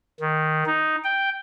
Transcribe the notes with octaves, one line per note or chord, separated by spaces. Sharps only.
D#3
D#4
G5